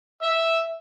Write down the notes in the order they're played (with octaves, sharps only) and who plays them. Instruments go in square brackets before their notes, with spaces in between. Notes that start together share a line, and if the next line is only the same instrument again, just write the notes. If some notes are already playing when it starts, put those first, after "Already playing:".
[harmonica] E5 E6